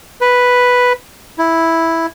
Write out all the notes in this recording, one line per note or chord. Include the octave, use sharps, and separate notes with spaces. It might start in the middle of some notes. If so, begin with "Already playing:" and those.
B4
E4